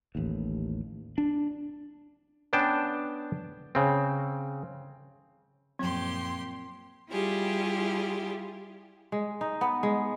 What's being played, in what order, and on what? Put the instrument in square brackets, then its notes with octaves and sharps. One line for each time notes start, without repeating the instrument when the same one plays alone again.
[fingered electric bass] A1 D#2
D4
[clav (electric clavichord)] B3 C#4 D4 G5 A5
C#3 C4
[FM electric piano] F#2 F3 G#6 [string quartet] A#2 G4 C6 [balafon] F#3 [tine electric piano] C4
[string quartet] G3 E4 F4 G4 G#4
[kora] G#3
D#4
B3
G#3